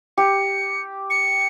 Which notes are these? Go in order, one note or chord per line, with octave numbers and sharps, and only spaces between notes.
G4 C#7
C#7